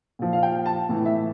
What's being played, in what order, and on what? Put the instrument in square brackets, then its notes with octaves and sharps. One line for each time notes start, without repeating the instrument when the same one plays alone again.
[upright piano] A#2 F3
F5
G5
A5
A2 E3
E5